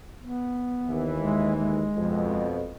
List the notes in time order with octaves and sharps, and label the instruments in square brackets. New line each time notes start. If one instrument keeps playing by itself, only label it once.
[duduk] B3
[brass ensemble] D#2 E3
[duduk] G#3
G#3
[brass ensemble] F2 B2